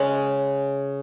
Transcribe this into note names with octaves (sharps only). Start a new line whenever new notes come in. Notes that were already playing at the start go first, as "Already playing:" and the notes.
Already playing: C#3 G#3 C#4 F#5